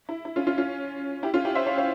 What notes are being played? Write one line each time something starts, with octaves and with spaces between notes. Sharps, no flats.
E4
E4
C#4 F4
C#4 F4
C#4 F4
E4 G4
C#4 F4
E4 G4
C5 E5
C#5 F5
C#5 F5